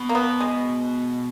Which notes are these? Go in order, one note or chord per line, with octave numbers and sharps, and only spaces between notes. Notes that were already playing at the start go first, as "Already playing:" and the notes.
Already playing: B2
A#3
B3
G#3